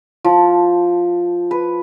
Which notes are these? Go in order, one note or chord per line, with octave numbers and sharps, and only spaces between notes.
F3
B4